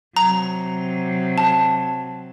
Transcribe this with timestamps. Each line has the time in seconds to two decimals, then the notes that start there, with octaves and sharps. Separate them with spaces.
0.16 C3 F#3 A#5
1.38 A5